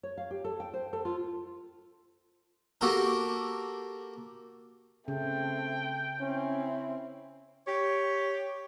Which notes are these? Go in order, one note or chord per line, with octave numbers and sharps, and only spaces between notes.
C#5
F5
G4
A4
G5
C5
A4
F4
A#3 F#4 G4 A4 A#4
C#3 A3 C4 G5
C4 C#4 E4
G4 C#5